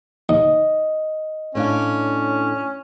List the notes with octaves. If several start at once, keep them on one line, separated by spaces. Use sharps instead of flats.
D#2 D#5
A2 C#4 D4 F5